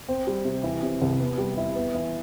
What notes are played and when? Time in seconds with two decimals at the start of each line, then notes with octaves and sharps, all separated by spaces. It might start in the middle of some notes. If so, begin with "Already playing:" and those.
0.09 C4
0.27 G3
0.45 C3
0.63 E3
0.83 C3
1.02 C2
1.20 B3
1.38 G3
1.57 E4
1.75 B3
1.95 E3